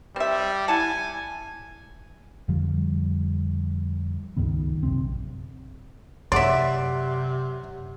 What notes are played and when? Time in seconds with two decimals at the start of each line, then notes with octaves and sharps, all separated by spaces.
0.16 G3 C4 E5
0.68 E4 F#5 G#5 A5
2.48 F2 D3 F3 G3
4.37 C#2 G2 D#3 B3
4.83 A#1 F#2 C3 C4
6.32 F#2 C3 C#5 D5 E5 F#5 C6